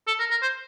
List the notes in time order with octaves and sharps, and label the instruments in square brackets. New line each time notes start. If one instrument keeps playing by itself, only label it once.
[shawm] A4
A#4
A#4
C5